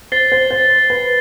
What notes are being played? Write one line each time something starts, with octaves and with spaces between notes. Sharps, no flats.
C5 A6 C7 G7
C5
C5
B4